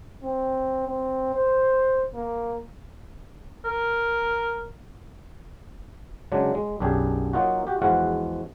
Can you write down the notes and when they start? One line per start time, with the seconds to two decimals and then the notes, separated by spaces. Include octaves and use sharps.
0.23 C4
0.88 C4
1.34 C5
2.15 A#3
3.64 A#4
6.32 C#3 F#3 G#3 D4
6.55 G#3
6.80 B1 F#2 D4 G4 G#4
7.33 F#3 A#3 D#4 F4 F#4
7.67 F#4 G4
7.82 E2 F3 G#3 F#4 F5 F#5